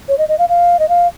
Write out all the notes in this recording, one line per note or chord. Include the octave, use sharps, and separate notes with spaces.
C#5
D#5
D#5
F5
F5
D#5
F5